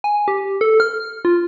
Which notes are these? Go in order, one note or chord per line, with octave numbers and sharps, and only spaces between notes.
G#5
G4
A4
F6
F4